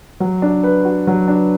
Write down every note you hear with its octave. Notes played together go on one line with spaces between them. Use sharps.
F#3
D4
B4
F#4
F#3
D4